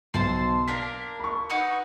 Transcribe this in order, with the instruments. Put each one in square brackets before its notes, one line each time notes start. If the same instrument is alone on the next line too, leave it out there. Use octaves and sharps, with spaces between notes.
[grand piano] B1 [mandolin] C5 A5 C6
[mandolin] A#3 D4 A#4 [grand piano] B6
[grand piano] B5 C#6
[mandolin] D#4 F#4 B4